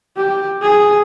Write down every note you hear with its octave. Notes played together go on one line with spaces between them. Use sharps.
G4
G#4